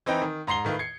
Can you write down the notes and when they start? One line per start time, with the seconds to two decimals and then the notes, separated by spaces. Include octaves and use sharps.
0.06 E3 C4 D#4 B4 G5 A#5
0.22 D#3
0.47 G#2 A#5 C6 C7 G7
0.65 A2 D#3 F4 B4
0.79 G#6 C7 C#7